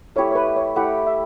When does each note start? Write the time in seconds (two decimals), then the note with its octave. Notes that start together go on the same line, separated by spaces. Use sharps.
0.16 A3 E4 G4 C#5
0.31 C#5
0.35 B4
0.56 C#5
0.76 A3 E4 G4 F#5
1.07 E5